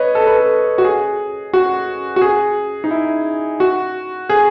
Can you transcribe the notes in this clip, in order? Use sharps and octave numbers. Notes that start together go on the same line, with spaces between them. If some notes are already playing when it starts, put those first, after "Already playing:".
Already playing: B4 C#5 D#5
A4
B4
A4
F#4
G#4
F#4
F#4
G#4
D#4
E4
F#4
G#4